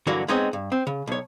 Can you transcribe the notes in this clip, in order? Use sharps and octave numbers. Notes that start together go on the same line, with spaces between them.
G2 D3 E3 F#3 A#3 F#4
G#3 B3 C4 D#4 C#5 D#5
G2
C4
C#3
B1 C#5